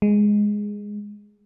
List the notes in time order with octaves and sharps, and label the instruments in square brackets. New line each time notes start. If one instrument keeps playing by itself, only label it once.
[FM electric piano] G#3